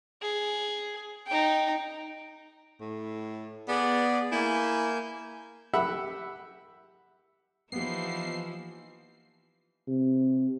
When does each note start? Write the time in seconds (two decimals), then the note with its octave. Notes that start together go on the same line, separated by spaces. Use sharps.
0.22 G#4
1.27 D#4 G5
2.81 A2
3.69 B3 G#4 D5
4.32 A#3 E4 G#5 G6
5.74 G4 E5 F#5 B5
7.72 E3 F3 A#3 B3 D#4 G4 C7
9.88 C3